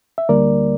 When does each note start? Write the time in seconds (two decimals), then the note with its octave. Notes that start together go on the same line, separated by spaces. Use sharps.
0.18 E5
0.29 D2 D3 G3 A#3 A#4 D5